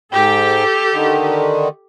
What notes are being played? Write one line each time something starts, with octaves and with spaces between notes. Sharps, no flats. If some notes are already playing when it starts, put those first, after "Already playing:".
G#2 G4 A4 G5
D3 D#3